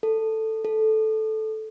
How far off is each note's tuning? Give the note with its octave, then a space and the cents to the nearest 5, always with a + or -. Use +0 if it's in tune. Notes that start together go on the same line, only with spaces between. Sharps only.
A4 +5
A4 -10